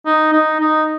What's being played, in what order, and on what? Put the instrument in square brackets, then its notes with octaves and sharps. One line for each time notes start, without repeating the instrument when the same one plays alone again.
[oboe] D#4
D#4
D#4